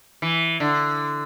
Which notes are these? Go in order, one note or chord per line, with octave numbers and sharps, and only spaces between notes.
E3
D3